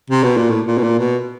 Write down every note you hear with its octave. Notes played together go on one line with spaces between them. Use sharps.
C3
B2
A#2
A2
A#2
B2
A#2
B2